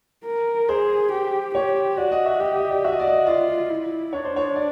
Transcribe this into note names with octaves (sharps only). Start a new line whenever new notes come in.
A#4
G#4 C5
G4
G4 C#5
F#4 D5
D#5
E5
G4 D#5
D#5
D5
F#4 E5
D#5
D5
D#5
F4 D5
E4
D4 C#5
C5
C#5
D5